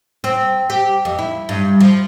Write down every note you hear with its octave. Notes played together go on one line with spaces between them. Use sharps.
C4
G4
F2
E4
G2
F3